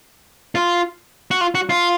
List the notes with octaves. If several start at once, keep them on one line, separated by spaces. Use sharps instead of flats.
F4
F#4
F4
F#4
F4